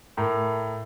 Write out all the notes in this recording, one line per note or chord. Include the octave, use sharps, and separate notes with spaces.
A2 A#4